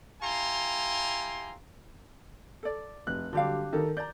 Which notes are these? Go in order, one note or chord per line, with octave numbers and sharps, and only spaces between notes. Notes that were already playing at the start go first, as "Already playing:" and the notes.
E4 G4 F5 G#5 A#5 C6
A4 D5
F1 F#6
D3 F#3 G3 D4 G4 F5
D#3 A4 A#4
D5 A#5 G6